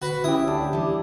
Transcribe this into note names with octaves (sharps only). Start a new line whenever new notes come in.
F#4 B4
C#4 E4 G4 E5 D#6
D2 D4 G4
E3 G3